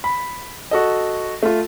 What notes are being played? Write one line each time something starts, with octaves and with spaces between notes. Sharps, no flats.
B5
F#4 A4 D#5
A3 F4